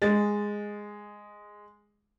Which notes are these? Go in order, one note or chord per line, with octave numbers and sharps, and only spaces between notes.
G#3 A6